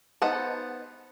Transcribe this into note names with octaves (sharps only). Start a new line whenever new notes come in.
B3 D#4 C5 F#5 A5